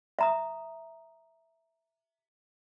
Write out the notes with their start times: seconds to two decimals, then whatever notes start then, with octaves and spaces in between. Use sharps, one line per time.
0.19 E5 A#5 D#6